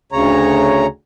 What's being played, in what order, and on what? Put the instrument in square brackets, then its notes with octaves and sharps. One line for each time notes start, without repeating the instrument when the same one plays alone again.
[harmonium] D2 C#3 C#5 A#5